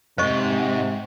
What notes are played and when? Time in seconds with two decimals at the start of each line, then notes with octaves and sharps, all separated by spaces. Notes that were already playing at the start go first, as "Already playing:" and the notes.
0.18 F2 G#2 C3 C5 D#5 C#6